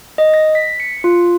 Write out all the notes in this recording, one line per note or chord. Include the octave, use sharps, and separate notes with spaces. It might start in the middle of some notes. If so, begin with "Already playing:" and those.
D#5
A#6
B6
C#7
F4